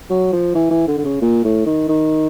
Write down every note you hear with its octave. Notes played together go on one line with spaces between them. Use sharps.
F#3
F3
E3
E3
D3
D3
C#3
A#2
A2
D#3
D#3